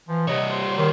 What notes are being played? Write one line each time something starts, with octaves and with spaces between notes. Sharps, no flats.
E3 F3
C3 G3 C#5 D#5
C5
D#3 C5